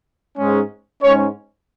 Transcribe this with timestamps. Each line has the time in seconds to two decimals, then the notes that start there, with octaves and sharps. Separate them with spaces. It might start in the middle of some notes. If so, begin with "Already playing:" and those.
0.38 G#2 G#3 C#4
1.03 G#2 G#3 C#4 C#5